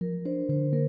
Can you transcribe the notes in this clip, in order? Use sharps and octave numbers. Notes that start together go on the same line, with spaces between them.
F3 A#4
D4 C5
D3 C5
A#3 A#4